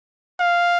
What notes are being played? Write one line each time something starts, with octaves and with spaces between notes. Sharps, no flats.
F5